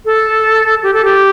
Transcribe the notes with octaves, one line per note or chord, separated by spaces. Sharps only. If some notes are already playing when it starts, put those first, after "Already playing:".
A4
G4
A4
G4